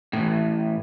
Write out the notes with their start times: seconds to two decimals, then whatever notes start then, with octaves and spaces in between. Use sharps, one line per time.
0.13 A2 E3